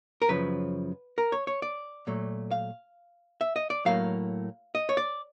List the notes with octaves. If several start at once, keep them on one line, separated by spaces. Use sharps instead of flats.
A#4
F#2 C#3 F3 B4
A#4
C#5
C#5
D5
A#2 F#3 A3
F5
E5
D#5
D5
A2 F#3 A#3 F5
D#5
C#5
D5